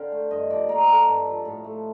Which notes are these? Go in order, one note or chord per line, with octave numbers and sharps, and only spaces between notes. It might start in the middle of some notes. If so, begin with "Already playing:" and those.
Already playing: D3 C4 F5 G5
A3
G2 D#5
F3 D5
A#3 A#4
D#4 A4
G2
F3
A2
A3